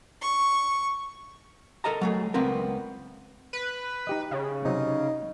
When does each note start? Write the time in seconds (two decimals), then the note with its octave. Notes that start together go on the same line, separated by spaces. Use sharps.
0.21 C#6
1.84 A4 A#4 D#5 A5 A#5
2.01 F#3 A3 G#4
2.34 C#2 B3 C4 A#4
3.53 B4
4.07 D#4 G4 D#5
4.31 C#3
4.65 C3 F#3 D#4